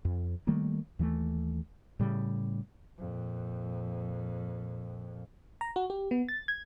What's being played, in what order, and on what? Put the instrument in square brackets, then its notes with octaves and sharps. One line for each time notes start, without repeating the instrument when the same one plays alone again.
[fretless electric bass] F2
D#3 G3 A3 A#3
D#2 E3 G3 A3
A2 C#3 G3
[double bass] F2 A#2
[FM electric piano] A#5
F#4
G4
B3
A6
G#6